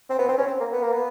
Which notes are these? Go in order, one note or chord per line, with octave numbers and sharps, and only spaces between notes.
C4
B3
C4
C#4
C4
A#3
B3
A#3
B3